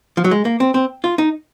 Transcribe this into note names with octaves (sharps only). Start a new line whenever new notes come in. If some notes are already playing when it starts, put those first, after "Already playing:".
F3
F#3
G#3
A#3
C4
C4
F4
D#4